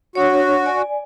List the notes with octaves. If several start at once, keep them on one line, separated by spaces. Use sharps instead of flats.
D4 F#4 C#5
D5 G#5